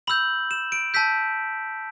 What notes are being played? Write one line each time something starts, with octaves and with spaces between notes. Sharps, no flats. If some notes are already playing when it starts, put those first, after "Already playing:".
B5 E6 G6 F#7
E7
D7
A5 E6 G6 B6